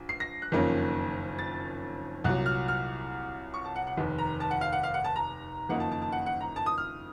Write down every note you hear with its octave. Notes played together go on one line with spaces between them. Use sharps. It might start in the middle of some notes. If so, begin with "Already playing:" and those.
Already playing: A#1
C7
A#6
F#6
F#1 F2 D#3 A#3 C#4
A6
C2 A#2 F#3 F#6
F6
F6
C#6
A5
F#5
F#5
F1 D#2 D#3
A#5
A5
F#5
F5
F#5
F5
F#5
A5
A#5
F#1 F2 D#3 A#3 D#4 F#5
A5
A5
A5
F#5
F#5
A#5
A5
D#6
F6